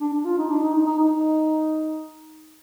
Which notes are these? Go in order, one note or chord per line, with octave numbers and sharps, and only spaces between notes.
D4
D4
F4
D#4
D4
D#4
D#4
D#4
D#4